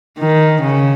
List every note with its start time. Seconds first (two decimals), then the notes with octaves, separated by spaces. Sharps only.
0.19 D#3
0.62 C#3